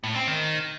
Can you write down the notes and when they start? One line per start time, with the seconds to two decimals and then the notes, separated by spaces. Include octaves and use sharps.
0.04 A2
0.15 C4
0.27 D#3